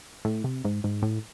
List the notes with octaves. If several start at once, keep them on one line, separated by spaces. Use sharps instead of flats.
A2
C3
G#2
G#2
A2